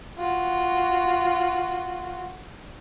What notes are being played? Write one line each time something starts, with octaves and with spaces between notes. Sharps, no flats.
F4 F#4